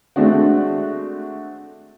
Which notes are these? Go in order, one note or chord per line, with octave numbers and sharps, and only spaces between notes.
G#3 A3 C4 D4 F#4